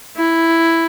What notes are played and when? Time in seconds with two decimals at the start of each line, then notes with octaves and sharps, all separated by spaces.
0.17 E4